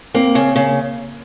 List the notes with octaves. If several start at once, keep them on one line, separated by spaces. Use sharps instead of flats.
A#3 C4
C#3
C#3 A#3